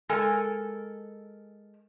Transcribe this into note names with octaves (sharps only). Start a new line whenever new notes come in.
G#3 A4 A#4 G#5